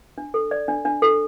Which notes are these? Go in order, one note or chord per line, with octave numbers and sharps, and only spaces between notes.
D4
A4
D5
D4
D4
A4